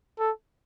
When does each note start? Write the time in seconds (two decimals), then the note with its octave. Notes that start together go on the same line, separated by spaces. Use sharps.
0.19 A4